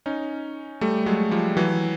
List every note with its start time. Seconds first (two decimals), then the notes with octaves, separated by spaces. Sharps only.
0.06 C#4 D#4
0.81 G3 A3
1.06 F#3 G#3
1.31 F3 G3
1.57 E3 F#3